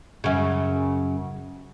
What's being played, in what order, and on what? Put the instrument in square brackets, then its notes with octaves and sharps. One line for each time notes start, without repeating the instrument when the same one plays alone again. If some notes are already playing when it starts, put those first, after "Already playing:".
[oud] F#2 C#3